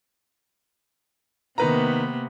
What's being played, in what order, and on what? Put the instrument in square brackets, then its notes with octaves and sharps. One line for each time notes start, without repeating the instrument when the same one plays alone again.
[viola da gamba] C3 A#3 B3 [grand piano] D#3 B4 A#5